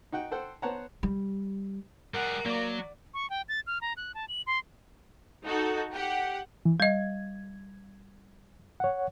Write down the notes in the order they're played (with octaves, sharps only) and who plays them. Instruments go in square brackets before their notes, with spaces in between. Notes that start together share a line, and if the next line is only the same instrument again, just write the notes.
[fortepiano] D#4 F#4 F#5 G5
A4 C5 F#5 G5
B3 C5 C#5 F#5 A5 A#5
[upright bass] G3
[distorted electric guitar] G3 G#4 [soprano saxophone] A#4 [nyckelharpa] F#5
[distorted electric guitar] F#3 [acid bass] A#3 [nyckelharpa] D5
[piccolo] C#6
G5
A6
F6
A#5
F#6
A5
F#7
C6
[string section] D#4 F#4 A4
G4 F#5
[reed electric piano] E3
[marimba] G3 D#5 [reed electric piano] G#6
[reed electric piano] C#5 F#5